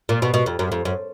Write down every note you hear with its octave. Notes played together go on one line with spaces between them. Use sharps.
A#2
B2
B2
F2
F#2
F2
F#2